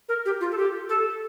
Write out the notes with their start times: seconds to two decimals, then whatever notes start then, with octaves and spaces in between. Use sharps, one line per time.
0.09 A#4
0.25 G4
0.41 F4
0.52 A4
0.57 G4
0.89 A4